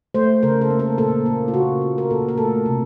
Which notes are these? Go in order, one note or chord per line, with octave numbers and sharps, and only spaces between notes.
A3 C5
C#3 A#4
A4
A#3
A#4
A#2 A4
A#3
F4
C#3 F#4
A#3
A#4
A#2 A4
A#4
A3 A4
C3